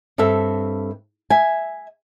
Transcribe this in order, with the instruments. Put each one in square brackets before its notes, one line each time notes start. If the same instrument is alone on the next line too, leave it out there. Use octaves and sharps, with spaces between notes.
[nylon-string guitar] G2 C4 A4 E5 A5
E5 G#5